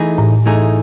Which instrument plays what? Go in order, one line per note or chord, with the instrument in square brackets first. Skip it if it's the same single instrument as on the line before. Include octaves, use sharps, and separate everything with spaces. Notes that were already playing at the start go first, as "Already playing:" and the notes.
Already playing: [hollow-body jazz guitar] E3 A3 D#4 G#4
[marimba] A2
[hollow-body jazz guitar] E3 A3 D#4 G#4